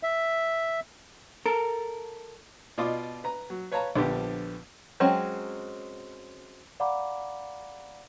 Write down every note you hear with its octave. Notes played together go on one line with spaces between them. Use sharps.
E5
A4 A#4
B2 F4 D5 D#5 D6
B4 A#5
F#3
B4 C#5 F5 A5 A#5
A#1 D3 F3 B3 G4
F#3 G#3 C4 C#4
D5 F5 F#5 A#5 B5 D6